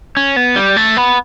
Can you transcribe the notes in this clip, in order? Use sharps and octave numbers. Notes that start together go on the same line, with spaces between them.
C#4
B3
G3
A3
B3